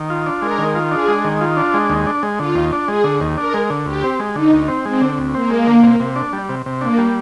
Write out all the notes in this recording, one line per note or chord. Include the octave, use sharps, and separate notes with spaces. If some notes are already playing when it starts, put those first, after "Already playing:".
Already playing: D#3
F4
D4
G#3 A#4
D#3
F4
D4 G#4
G#3
D#3
F4
D4
G#3
D#2
D4
G#3
D3 F4
D#2
D4
G#3 G#4
D3
D#2
D4 A#4
G#3
D3
D2 G4
C4
G#3
D3 D#4
D2
C4
G#3 C4
D3
D2
A#3 C4
G#3
D3
C3
C3
D4
G3
C3
C3
A#3 D4
G3